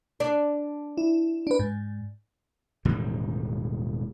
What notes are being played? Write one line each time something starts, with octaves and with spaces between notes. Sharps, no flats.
D4
E4
D4 B4
G#2
E1 A2 D#3 G3